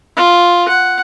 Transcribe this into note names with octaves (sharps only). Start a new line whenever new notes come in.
F4
F#5